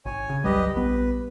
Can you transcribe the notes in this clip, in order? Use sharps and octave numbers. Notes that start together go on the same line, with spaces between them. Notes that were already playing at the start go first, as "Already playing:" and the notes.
G#1 C#5 G#5
C#3
G1 C#2 F#3 G3 G4 B4 D#5
A#1 B3 B4